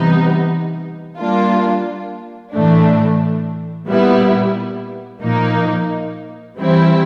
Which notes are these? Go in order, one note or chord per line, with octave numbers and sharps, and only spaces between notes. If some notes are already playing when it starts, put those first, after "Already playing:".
Already playing: C3 E3 G3 B3 D#4
G3 A#3 D4 F4
A2 E3 A3 D4
A#2 G3 B3 E4
A#2 F3 A#3 D#4
E3 G3 C4 E4